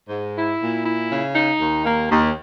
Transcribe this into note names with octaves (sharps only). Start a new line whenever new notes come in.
G#2
E4
A#2
E4
C#3
D#4
D#2
A#3
D#2